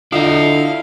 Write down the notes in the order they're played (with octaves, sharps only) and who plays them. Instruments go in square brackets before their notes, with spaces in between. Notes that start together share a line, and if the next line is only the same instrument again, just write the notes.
[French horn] D3 [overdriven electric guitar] E4 D#5 [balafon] F4 [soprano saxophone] F5